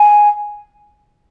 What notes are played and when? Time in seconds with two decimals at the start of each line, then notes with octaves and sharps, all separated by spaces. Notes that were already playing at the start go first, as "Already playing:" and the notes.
Already playing: G#5